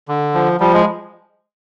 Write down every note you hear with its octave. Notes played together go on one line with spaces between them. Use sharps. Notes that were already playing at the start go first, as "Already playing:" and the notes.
D3
F3
F3 G3
G#3